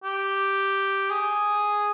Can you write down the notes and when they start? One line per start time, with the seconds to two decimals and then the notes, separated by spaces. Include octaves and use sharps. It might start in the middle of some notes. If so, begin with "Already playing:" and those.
0.04 G4
1.10 G#4